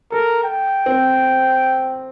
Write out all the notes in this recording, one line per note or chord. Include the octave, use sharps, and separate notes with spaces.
A4 A#4
G5
C4